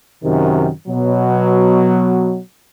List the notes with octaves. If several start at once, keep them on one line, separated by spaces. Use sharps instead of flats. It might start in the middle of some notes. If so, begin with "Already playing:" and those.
F#2 C3 D#3
B2 F#3